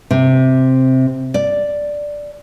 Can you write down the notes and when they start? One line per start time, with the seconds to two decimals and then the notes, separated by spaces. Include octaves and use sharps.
0.11 C3
1.34 D5